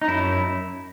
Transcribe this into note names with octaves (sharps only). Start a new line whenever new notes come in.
D#4
F#2 E4